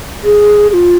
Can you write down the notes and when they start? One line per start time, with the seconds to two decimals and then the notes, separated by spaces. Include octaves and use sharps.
0.24 G#4
0.70 G#4
0.74 F4